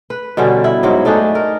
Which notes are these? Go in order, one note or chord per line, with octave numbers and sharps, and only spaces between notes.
B4
B2 D3 G3 C#4
E4
G#2 F#3
A3 D4 D#4 G#4
A#4